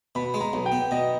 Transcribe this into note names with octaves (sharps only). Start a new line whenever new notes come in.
B2 B5
G#3
A#5
B1
G5
B3
B2 D#5